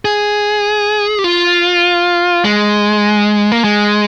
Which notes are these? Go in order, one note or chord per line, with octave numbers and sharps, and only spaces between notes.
G#4
G4
F4
G#3
A#3
G#3